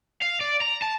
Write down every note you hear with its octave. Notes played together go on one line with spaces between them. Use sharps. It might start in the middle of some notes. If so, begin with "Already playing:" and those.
F5
D5
A#5
A5